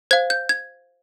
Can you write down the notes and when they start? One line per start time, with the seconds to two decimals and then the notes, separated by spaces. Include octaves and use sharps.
0.11 C5 F5 G#6
0.30 G6
0.49 G#6